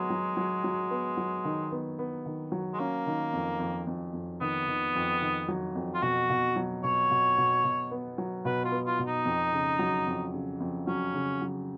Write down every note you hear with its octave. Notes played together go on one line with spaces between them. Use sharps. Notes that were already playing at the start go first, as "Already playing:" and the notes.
Already playing: F#3 G#3 B3
F#3
F#3
F#3
B3
F#3
D#3
B3
B3
D#3
F#3
G#3
A#3 C#4
D#3
F2
F2
F2
F2
D#3 B3
D#3
F2
D#3
F#3
F2
F4
B2 F#4
B2
F#3
B2 C#5
B2
B2
B2
B3
F#3
B2 B4
F4
B3
F4
B2
D#4
F2
C#3
F#3
F2
C#3
F2
F#3 C#4
C#3
F#3